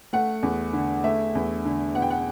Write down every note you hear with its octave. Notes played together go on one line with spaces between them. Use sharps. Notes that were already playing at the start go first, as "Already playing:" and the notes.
A3 F#5
E2
D3
A3 E5
E2
D3
B2 F#5
G5
F#5